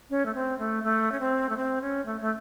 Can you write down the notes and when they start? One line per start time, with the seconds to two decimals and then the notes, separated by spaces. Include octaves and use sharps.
0.10 C#4
0.26 A3
0.35 C4
0.59 A3
0.84 A3
1.12 C#4
1.20 C4
1.49 A3
1.57 C4
1.82 C#4
2.06 A3
2.21 A3